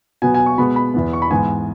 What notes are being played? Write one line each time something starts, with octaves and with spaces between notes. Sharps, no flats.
B2 F#3 B3 G#5
G#5
C#6
B2 G#3 B3 B5
B5
E2 E3 B3
C#6
B5
G#2 E3 B3 G#5